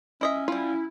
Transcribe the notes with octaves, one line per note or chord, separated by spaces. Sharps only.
C#4 E4 D#5 E5
G3 E4 F4